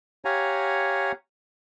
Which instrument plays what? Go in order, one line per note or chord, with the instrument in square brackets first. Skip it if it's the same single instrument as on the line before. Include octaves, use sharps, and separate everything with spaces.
[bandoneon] G4 C#5 F5 F#5 G#5 A#5